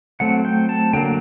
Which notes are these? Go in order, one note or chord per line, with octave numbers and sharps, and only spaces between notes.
F#3 A3 C4 F#5
G5
A5
D3 F#3 A#3 G5